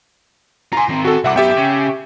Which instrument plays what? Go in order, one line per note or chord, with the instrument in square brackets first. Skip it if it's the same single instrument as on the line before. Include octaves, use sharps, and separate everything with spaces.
[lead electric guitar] F4 G#5 [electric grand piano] A#5 C6
[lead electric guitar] D#3 C4
[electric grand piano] F#4 A4
[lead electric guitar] C2 [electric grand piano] E5 F#5 D6
[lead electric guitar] F#2 B3 [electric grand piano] G4 E5 G5
[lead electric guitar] C#3